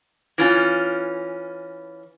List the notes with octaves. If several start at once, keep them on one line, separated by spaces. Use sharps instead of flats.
E3 C#4 F4